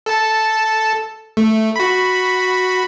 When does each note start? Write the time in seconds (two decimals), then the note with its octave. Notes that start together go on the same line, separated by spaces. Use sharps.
0.06 A4 A5
1.37 A3
1.76 F#4 B5